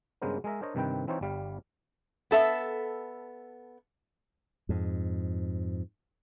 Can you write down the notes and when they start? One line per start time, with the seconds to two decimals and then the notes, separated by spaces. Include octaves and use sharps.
0.22 G2 C#3 G#3 B3 A#4 C5
0.44 G#3 G#4 A#4 D#5 E5
0.61 D4 A#4 C5 C#5 D#5
0.75 G2 C3 D#3 C4 B4 G5
1.07 E3 C4 D#4 F4 C5 C#5
1.21 G1 G3 F5
2.31 B3 A4 E5
4.69 F2 G#2